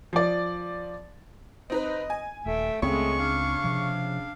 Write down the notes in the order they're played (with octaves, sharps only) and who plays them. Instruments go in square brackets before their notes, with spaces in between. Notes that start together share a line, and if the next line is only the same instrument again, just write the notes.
[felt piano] F3 D5
[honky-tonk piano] C4 D#4 B4 [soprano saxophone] D#5
[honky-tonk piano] G#5
[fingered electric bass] D#1 [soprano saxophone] A3 [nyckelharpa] E5 G5
[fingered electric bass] C#2 C4 [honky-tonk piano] C#3 [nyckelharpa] G#3 A3 [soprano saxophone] C#6
[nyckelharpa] D4 F5
[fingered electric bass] C3 F3